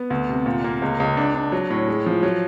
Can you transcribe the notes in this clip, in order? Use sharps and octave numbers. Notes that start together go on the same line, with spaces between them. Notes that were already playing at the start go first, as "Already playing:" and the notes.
Already playing: B3
D2
C3
A#2
A#3
C#2
C#2
D4
D4
F#3
A2
G#3
F3
F#3